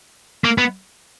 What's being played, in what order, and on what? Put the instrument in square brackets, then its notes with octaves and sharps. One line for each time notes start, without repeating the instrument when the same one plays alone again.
[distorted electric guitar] A#3
B3